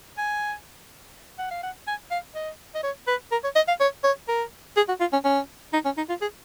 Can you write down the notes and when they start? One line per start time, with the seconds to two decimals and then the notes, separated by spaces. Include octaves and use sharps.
0.18 G#5
1.39 F#5
1.51 F5
1.63 F#5
1.87 G#5
2.11 F5
2.35 D#5
2.75 D#5
2.83 C#5
3.08 B4
3.32 A#4
3.44 C#5
3.55 D#5
3.68 F5
3.80 C#5
4.04 C#5
4.28 A#4
4.77 G#4
4.89 F#4
5.00 F4
5.13 C#4
5.25 C#4
5.73 D#4
5.85 C#4
5.97 D#4
6.09 F4
6.22 G#4